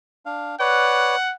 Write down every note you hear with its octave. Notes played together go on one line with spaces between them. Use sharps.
D4 F5
B4 C#5 D5 F#5